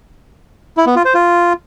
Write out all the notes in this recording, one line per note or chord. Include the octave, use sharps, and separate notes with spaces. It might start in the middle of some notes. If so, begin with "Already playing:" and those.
E4
B3
F4
C5
F4